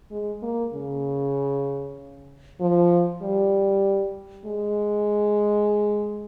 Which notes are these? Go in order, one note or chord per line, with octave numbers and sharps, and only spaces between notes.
G#3
A#3
C#3
F3
G3
G#3